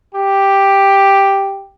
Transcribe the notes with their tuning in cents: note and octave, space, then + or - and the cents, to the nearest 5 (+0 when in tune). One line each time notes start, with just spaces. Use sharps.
G4 +5